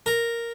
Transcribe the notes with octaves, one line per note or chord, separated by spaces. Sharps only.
A#4